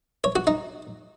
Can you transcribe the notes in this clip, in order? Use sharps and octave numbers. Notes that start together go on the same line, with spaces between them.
C#5
F#4
D#4